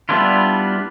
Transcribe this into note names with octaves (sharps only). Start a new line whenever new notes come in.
G3 B3 D4 E4 F4